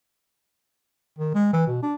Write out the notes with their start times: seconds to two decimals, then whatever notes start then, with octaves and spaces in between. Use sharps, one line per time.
1.18 D#3
1.34 G#3
1.53 E3
1.67 B2
1.82 D4